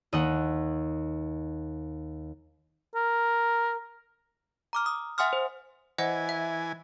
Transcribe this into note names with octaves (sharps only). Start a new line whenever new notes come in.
D#2 D#5 F#5
A#4
A#5 D6 F6
D#6
E5 F#5 G#5 C6 D#6 F6
C5
E3 C5 D#5 F#5 G#5
E5